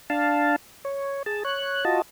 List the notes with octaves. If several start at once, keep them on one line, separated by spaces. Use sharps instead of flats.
D4 F5 A5
C#5
G#4 A5
C#5 F#6
F4 F#4 D#5 A5